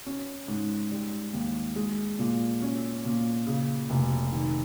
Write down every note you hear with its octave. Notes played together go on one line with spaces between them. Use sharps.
C#4
G#2
G3
D#2
G#3
A#2
C#4
A#2
C#3
F1
D#3